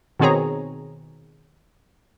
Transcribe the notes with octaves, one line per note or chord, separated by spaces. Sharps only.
B2 D#3 C4 G#4 C#5 A#5